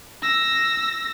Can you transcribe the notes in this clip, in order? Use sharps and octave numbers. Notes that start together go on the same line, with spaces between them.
E6 A#6